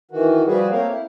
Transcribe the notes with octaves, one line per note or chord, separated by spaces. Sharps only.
D#3 E3 F#4
F3 G3 F#4 G#4 B4
A3 A#3 C4 A#4 C#5 F5
E4